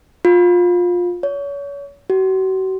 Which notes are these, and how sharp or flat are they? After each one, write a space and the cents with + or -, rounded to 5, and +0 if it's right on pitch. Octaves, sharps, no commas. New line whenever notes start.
F4 +20
C#5 +35
F#4 +40